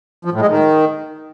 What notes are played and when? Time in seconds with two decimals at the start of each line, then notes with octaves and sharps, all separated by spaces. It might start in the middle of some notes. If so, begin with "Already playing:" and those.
0.25 F3
0.33 A2
0.41 G#3
0.49 D#3